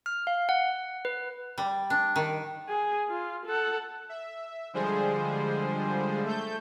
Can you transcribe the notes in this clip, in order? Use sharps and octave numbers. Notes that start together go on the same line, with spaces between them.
F6
F5
F#5
B4
G3
D4
D#3
G#4
F4
A4 F#5
E5
D3 F3 G3 G#3 G#4 C5
A3 A4 G6